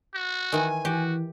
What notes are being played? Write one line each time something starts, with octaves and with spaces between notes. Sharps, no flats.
F#4
D#3 E3 G#5
E3 F#4 G4